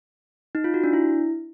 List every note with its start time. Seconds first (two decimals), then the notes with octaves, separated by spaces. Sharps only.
0.55 D#4
0.64 F4
0.74 F#4
0.84 D4
0.93 E4